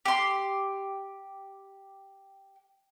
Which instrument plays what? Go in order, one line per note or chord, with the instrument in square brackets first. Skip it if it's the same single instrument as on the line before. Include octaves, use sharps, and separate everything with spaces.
[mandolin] G4 C6